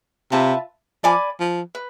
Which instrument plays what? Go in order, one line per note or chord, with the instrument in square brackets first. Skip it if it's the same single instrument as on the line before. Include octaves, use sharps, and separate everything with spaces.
[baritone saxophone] C3 [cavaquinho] F4 B4 E5 A5
[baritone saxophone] F3 [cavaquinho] D5 G#5 B5 D6
[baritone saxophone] F3
[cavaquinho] B4